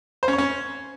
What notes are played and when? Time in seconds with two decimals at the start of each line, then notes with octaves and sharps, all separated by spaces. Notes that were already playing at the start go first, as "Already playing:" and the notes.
0.23 C5
0.28 C#4
0.33 C#5
0.38 C#4